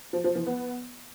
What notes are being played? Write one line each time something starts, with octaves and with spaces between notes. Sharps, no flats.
F3
F3
E3
B3